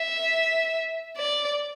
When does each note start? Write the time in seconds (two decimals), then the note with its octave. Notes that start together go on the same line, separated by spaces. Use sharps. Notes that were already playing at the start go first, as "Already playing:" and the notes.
Already playing: E5
1.17 D5